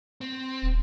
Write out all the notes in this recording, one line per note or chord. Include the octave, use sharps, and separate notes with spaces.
C4
D#1